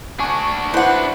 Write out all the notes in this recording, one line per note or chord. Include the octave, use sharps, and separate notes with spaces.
D4 F#4 G#5 C#6
E4 B4 C5 D5 F#5